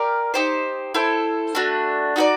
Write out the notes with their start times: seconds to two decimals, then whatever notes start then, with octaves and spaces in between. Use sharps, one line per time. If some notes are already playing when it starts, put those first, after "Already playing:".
Already playing: G4 A#4 D5 F5
0.34 D#4 G4 C5
0.94 E4 A4 C5
1.55 A3 D4 F#4
2.16 D#4 F#4 A4 D5